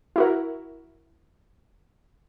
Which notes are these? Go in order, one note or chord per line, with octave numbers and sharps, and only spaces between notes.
E4 F#4 A#4